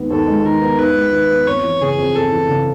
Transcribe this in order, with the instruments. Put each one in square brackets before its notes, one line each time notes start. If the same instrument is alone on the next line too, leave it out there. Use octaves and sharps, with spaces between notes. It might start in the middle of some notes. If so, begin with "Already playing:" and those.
Already playing: [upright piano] D#2 D#3 G#3 B3
[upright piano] D#2 [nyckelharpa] A4
[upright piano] G#3
[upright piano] D#3 [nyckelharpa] A#4
[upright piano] B3
[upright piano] D#2 [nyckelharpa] B4
[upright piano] G#3
D#3
B3
[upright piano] F2 [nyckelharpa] C#5
[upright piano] E3
[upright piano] C#3 [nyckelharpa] G#4
[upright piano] F2
[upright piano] F2 [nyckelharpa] A4
[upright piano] E3
C#3